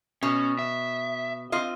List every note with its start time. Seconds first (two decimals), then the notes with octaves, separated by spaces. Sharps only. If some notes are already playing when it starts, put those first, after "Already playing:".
0.23 B2 C#4
0.59 E5
1.52 C4 F4 D#5